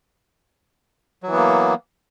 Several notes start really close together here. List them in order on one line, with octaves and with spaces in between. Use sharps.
F#3 E3 B3 A#3